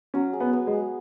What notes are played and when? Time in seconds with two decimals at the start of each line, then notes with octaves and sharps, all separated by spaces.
0.14 F#3 C#4
0.33 G#4
0.40 B3
0.53 B3
0.67 G#3
0.73 G#4